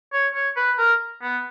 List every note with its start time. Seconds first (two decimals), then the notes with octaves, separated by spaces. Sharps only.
0.13 C#5
0.35 C#5
0.57 B4
0.78 A#4
1.22 B3